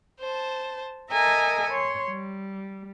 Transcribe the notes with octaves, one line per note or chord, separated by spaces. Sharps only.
C5 A5
A4 A#4 D#5 E5 G#5 A#5
C#5 C6
G3